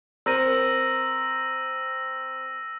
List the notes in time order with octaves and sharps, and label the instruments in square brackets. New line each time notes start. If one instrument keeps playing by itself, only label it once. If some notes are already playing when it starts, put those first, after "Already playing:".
[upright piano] C4 G4 A#4 [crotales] E6 A#6 D#7